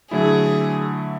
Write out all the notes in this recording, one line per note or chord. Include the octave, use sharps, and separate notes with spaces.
D3 F#3 A3 E4 G#4